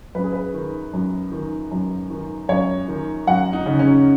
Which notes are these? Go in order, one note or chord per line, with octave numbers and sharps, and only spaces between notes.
F#2 B4
G#4
B4
D#3
F#2
D#3
F#2
D#3
F#2 C#5
D#3
F#2 F#5
D#4
C#3
C#4